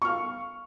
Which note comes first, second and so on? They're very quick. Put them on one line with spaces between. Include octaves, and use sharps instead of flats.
C#6 F6 F5